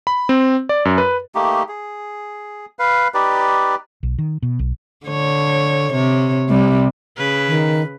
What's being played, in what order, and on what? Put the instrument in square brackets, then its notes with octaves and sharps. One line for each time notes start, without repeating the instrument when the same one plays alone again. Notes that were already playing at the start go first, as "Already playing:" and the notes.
[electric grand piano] B5
C4
D5
F#2
B4
[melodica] A3 A#3 D#4 G4
G#4
B4 F5
D#4 G4 B4 D5
[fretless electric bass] B1
D#3
B2
B1
[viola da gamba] D3 C#5
C3 C#5
C3 G3
C#3 B4
[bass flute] D#3